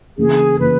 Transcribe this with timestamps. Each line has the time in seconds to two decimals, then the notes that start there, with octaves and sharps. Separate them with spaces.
0.17 C#3 E3 A#3 G#4
0.58 C#3 E3 A#3 B4